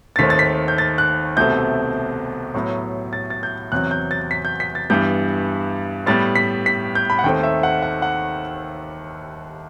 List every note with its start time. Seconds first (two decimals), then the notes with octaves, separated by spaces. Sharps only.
0.16 A6
0.19 D#2 D#3 A3 C4 B6
0.30 A6
0.39 B6
0.68 G6
0.78 A6
0.98 F#6
1.36 C2 B2 A3 C4 G6
2.54 A2 F#3 B3
3.13 A6
3.30 A6
3.43 G6
3.72 E2 C3 F#3 F#6
3.91 G6
4.11 A6
4.31 B6
4.45 G6
4.60 B6
4.75 A6
4.90 G2 E3 G3 B3 G6
6.06 A2 G3 B3 A6
6.36 B6
6.66 B6
6.95 G6
7.10 B5
7.19 F#5
7.24 D#2 D#3 A3 C4 G5
7.43 E5
7.63 F#5
7.82 F#5
8.02 F#5